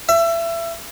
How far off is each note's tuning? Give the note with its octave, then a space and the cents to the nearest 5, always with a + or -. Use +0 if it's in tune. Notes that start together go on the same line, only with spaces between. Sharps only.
E5 +25